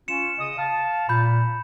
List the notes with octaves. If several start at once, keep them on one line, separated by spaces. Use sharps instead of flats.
C#4 F4 C#7 E7
C#3 D#5 D#6
F5 A5
A#2 B5 G6